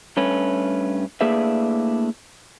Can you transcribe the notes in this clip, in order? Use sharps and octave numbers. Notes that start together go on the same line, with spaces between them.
G2 A3 C#4 B4
A2 A#3 D4 G#4 B4 E5